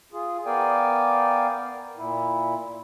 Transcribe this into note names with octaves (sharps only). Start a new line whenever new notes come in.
F4 G#4
B3 A#4 D5 F5 G5 G#5
A#2 E4